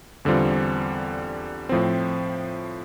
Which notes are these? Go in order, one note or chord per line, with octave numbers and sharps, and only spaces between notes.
E2 D3 G3 C4 F4
A2 F3 C4